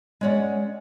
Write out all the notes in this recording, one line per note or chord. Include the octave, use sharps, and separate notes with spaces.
G#3 C#4 C#5 D5 F#5